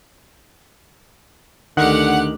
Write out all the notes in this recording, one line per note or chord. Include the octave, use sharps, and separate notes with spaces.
D2 D3 D#3 G4 F#5 F#6